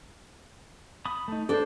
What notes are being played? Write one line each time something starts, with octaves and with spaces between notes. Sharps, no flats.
B5 D#6
A3 D#4
D4 A4 C5 D5